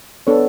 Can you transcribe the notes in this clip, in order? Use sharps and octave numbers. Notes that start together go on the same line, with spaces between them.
B3 D4 A4 C#5